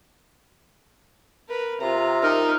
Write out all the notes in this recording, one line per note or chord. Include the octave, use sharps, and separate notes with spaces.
A#4 B4
C3 F4 A#5
D#4 A#4